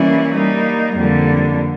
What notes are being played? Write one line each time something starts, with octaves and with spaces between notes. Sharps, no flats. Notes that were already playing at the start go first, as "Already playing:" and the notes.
Already playing: E3 G3 A#3 C#4 E4
G3 A#3 D#4
F2 D3 G3 A#3